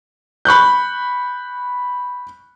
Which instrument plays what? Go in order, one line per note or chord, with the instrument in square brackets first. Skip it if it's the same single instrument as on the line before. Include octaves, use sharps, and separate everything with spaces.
[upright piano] B5 C#6 F#6 G6